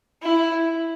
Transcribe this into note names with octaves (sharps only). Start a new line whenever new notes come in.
E4